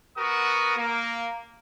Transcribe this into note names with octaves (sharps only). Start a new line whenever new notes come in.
B3 F#4 A#4 D#6
A#3